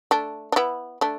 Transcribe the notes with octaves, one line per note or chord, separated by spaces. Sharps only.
A3 D4
D4
B3 E4
A3 D4